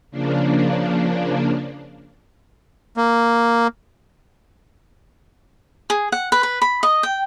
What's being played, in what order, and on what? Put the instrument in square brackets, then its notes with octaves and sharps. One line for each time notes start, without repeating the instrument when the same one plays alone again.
[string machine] C#3 F3 A#3 D4
[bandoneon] A#3
[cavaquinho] G#4
F#5
B4
B4
B5
D#5
G5